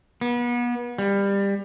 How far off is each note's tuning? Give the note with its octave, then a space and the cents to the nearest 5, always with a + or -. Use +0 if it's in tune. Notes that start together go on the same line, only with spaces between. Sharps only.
B3 -35
G3 +20